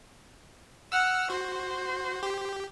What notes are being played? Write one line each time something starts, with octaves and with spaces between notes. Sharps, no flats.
F#5 E6 F6
F#4 C5
G4